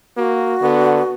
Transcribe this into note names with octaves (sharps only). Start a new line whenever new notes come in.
A#3 F#4
D3 B3